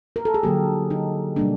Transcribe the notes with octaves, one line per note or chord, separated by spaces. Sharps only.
A#4
A4
G#4
D3 F#3 A#3 G4
D#4
B2 G3 A#3 D4